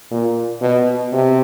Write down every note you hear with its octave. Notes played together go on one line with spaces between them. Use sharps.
A#2
B2
C3